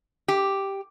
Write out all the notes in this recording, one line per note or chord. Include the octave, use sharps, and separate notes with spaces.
G4